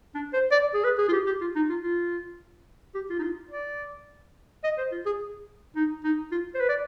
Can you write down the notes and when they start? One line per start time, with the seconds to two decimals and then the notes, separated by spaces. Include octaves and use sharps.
0.15 D4
0.34 C5
0.51 D5
0.74 G#4
0.84 B4
0.98 G#4
1.09 F4
1.13 G4
1.26 G4
1.41 F4
1.56 D#4
1.69 F4
1.83 F4
2.95 G4
3.10 F4
3.19 D#4
3.23 F4
3.51 D5
4.64 D#5
4.78 C5
4.92 F4
5.06 G#4
5.76 D#4
6.04 D#4
6.32 F4
6.55 C5
6.60 B4
6.69 D5